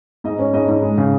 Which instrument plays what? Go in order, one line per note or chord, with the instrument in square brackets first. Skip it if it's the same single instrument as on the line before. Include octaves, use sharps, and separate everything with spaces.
[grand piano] G#2 D#5
C#4
G#2 D#5
G#2
G#3
C#3